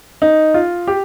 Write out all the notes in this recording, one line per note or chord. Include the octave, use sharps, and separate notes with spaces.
D#4
F4
G4